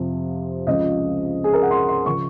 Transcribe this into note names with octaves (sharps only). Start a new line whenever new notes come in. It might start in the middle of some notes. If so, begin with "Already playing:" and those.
Already playing: F2 C3 F3
C#2 C#3 F3 D#5
G#4
A#4
F#5
C6
C6
C#3 F3 C#6